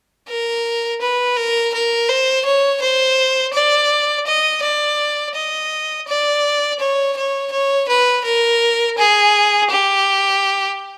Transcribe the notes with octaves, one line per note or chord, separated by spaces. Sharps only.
A#4
B4
A#4
A#4
C5
C#5
C5
D5
D#5
D5
D#5
D5
C#5
C#5
C#5
B4
A#4
G#4
G4